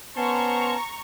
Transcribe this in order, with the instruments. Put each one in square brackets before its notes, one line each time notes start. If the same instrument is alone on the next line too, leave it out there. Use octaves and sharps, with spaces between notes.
[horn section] B3 C5 C6 [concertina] C#4 A5 [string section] A#5 C#6